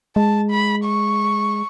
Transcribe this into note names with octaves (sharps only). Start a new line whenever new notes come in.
G#3 A5
B5
C#6